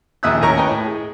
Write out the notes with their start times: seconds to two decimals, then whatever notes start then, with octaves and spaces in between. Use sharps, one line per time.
0.23 A#1 D#2 E5 D#6 E6 F#6
0.41 D#2 A2 C#4 A#4 A#5 C#6
0.56 B4 C#5 D#5 G5 G#5 A#5
0.70 A2
0.85 G#4